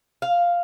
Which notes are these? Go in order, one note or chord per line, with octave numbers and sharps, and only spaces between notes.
F5